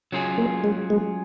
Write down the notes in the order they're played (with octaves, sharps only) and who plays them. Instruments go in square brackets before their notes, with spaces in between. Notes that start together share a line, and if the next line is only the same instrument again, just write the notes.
[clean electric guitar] F#3 C#4 F4 G#4
[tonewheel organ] A#3
G#3
G#3